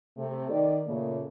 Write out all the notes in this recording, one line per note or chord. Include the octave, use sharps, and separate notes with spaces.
C3 A3
D#3 D5
A#2 C#3 A3 A#3